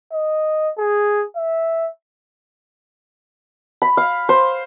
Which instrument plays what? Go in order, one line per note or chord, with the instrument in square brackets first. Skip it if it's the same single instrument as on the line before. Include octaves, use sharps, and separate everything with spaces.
[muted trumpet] D#5
G#4
E5
[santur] B5
F5
C5